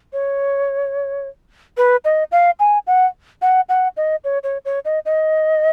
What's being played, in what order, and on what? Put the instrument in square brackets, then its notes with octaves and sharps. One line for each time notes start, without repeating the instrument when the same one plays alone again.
[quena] C#5
B4
D#5
F5
G#5
F#5
F#5
F#5
D#5
C#5
C#5
C#5
D#5
D#5